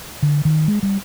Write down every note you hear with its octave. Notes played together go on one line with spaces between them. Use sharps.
D3
D#3
G#3
G3